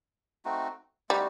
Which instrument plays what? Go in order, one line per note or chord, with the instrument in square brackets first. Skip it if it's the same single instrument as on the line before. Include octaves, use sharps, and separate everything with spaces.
[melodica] A3 C4 D#4 F#4
[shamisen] G3 [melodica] A3 C4 D#4 F#4